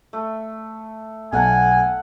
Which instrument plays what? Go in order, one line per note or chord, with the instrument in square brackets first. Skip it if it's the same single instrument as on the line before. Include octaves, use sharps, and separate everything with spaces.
[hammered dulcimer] A3
[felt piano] B1 A5 [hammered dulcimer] F5 F#5 [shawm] G#5